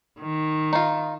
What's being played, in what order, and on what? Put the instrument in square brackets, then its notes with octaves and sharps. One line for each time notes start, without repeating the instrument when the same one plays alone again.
[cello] D#3
[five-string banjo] D#4 F4